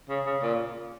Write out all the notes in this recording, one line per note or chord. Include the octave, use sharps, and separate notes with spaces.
C#3
C#3
A#2